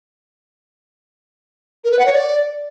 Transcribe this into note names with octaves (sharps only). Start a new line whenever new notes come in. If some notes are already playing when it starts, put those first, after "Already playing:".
A#4
B4
F#5
C#5
D5